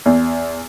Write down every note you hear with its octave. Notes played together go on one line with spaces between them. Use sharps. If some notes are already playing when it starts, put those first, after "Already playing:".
E2